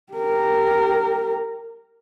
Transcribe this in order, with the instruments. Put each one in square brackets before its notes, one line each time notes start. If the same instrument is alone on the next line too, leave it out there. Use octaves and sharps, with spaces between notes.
[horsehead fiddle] G4 A#4